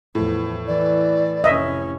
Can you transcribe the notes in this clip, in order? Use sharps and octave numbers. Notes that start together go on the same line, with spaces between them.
E2 A2 F3
E3 D5
F1 C#4 D#5 E5